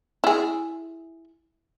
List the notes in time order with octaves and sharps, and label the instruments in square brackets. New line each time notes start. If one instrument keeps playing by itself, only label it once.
[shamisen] E4 G#4